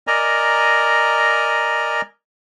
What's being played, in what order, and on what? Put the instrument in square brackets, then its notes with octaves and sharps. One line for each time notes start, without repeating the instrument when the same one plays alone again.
[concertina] A#4 D5 D#5 G#5 A#5